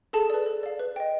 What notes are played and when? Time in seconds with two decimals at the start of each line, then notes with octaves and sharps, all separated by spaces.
0.13 G#4 A4 A5
0.30 B4 D5
0.46 A4
0.63 D5 F5
0.79 B4
0.96 D#5 G5